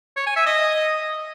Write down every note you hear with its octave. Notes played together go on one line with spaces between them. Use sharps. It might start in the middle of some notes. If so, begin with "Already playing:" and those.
C#5
G#5
E5
D#5